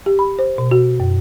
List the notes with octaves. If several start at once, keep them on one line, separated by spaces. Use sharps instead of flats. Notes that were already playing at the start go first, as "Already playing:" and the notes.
G4
B5
C5
B2
F#4
F#2